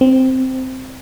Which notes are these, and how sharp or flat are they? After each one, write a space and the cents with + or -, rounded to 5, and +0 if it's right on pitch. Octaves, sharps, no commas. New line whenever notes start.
C4 -5